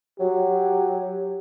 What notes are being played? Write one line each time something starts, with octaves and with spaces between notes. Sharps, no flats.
F#3 G4